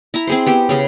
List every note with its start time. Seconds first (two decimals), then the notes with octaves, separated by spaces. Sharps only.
0.14 E4 E5 A#5
0.27 C4 G#4 C5
0.46 B3 G4 C5
0.69 C#3 C#4 G#4